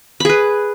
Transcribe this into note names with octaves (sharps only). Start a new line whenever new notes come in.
G#4 B4 B5